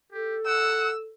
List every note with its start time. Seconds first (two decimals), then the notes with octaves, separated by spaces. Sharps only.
0.12 G4 A4
0.46 F#5 E6